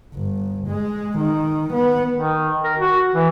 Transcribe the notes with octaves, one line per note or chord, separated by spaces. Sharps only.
G1
G#3
D#3
B3
D#3
A#4
F#4
E3